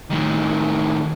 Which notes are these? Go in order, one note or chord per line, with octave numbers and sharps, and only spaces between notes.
A2 D#3